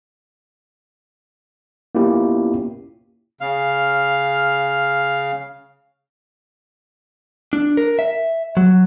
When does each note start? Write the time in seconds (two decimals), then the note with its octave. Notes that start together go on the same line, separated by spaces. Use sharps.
1.95 A#3 B3 C#4 E4 F4 G4
3.41 C#3 F5 F6
7.53 D4
7.77 A#4
7.99 E5
8.57 F#3